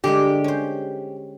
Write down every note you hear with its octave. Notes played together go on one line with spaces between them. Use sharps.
D3 G3 G#3 G4
C#4 C5